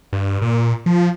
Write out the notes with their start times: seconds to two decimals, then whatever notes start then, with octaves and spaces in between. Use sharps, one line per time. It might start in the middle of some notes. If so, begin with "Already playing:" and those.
0.13 G2
0.42 A#2
0.86 F3